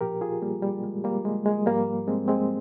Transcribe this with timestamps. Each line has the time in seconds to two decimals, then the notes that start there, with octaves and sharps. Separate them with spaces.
0.01 A#2 F3 G4 A#4
0.21 F4 G#4
0.42 G3 A#3
0.63 G3
0.84 G#3
1.04 G3 A#3
1.25 G#3
1.46 G#3
1.66 G#2 F3 G3 A#3
2.08 G#3 C4
2.28 G#3 C4